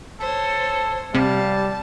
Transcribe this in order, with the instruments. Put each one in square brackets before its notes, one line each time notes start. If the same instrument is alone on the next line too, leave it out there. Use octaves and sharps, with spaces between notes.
[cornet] A4 [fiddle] C5 C#5
[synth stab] C3 [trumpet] G3 [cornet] F5 [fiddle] A5